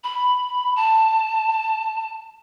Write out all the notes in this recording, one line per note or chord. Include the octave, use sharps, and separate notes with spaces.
B5
A5